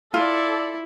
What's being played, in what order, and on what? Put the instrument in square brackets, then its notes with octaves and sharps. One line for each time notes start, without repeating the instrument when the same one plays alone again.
[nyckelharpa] E4 [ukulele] F4 [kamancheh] A4 D5